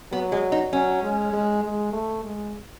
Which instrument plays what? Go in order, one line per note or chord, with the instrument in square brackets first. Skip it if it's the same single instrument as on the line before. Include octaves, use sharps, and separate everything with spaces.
[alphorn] F#3 [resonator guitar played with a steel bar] B3
[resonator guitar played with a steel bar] G#3
D#4
[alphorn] F#3 [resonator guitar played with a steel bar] C#4
[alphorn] G#3
G#3
G#3
A3
G#3